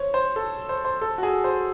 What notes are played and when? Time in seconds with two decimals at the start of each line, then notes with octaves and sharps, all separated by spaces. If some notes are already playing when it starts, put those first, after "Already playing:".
Already playing: C5 C#5
0.14 C5
0.36 A4
0.69 C5
0.85 C5
1.01 A4
1.18 F#4
1.23 G#4
1.44 C5